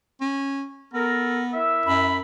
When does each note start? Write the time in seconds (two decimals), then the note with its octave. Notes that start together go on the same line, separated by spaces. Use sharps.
0.21 C#4
0.94 B3 A4 A#4
1.54 E4 A#4 E5
1.86 F#2 B5